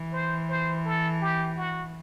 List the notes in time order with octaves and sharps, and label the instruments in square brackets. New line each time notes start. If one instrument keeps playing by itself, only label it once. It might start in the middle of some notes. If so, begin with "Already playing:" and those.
Already playing: [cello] E3
[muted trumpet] C5
C5
A4
G4
F#4